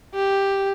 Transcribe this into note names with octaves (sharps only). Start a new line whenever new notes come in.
G4